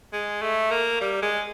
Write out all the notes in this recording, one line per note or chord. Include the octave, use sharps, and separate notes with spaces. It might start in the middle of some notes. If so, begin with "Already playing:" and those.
G#3
A3
A#3
G3
G#3